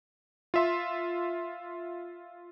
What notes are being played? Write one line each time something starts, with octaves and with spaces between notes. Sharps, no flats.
F4 E5 C6